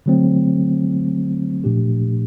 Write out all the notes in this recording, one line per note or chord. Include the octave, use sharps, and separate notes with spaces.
D3 F#3 A3 C4
A#2 F3 A3 D4 G4